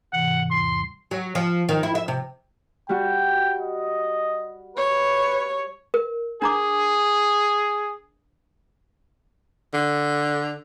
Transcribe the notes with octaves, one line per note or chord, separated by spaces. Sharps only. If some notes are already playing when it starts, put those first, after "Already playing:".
G#2 C3 E3 F#5
E2 G3 C6
F#3
F3
D#3
E4
E5
C3
G3 F#4 G5
D#5
B4 C#5
A#4
D4 G#4 A#5 D6
D3